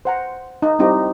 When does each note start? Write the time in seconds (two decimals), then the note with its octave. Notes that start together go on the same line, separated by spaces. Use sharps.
0.05 C5 F#5 A#5
0.62 D#4
0.79 G3 C4 D#4 E4 G4